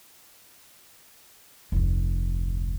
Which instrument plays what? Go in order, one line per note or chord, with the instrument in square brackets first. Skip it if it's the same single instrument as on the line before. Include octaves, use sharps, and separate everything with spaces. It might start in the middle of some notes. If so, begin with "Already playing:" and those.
[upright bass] F1 D2